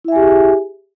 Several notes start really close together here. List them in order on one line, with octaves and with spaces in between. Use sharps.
E4 E5 G#5 G4 G#4